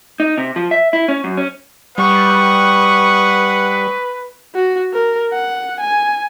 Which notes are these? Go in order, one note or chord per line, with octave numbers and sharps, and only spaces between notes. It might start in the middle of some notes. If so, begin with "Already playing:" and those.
D#4
C3
F3
E5
E4
C#4
F#2
C#4
G3 B4 F#5 C#6 D#6
F#4
A#4
F#5
G#5